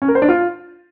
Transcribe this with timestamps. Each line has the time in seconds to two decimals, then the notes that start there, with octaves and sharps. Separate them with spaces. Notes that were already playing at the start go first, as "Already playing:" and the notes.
0.02 C#4
0.08 A#4
0.15 C5
0.22 D4
0.29 F4